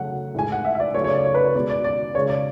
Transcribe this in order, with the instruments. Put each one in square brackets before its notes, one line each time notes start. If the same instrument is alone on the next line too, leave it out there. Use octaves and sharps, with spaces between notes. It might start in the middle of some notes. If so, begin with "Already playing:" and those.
Already playing: [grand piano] C#3 F#3 A3 F#5
A2 G#3 G#5
F#5
E5
E5
D5
C#3 F#3 A3 C#5
C#5
D5
C#5
B4
C#5
B2 G#3 D5
D5
D5
C#3 C#5
G#3
D5